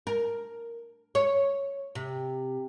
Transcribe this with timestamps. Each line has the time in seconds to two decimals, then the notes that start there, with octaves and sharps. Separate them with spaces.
0.07 A#4
1.15 C#5
1.95 C3